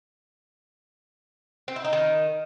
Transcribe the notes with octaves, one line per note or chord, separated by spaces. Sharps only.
C4
E4
D#4
D#3